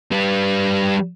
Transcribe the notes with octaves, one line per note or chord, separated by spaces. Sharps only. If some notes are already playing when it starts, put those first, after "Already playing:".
G3 B4